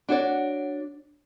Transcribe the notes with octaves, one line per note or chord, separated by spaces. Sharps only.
D4 F#4 C#5 D5